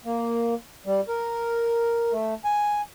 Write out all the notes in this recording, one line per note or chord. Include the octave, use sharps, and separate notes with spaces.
A#3
G3
A#4
A3
G#5